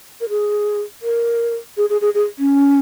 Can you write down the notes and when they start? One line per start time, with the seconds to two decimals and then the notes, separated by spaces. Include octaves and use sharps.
0.21 A#4
0.29 G#4
1.02 A#4
1.77 G#4
1.90 G#4
2.01 G#4
2.14 G#4
2.39 C#4